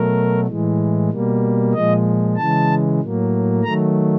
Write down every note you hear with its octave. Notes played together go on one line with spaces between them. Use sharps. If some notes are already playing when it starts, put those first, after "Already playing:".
Already playing: B2 F#3 A3 A#4
A2 E3 G#3
B2 G3 A#3
A#2 F3 G#3 D#5
C#3 E3 G#3 A5
A2 F#3 A#3
D#3 F#3 A3 A#5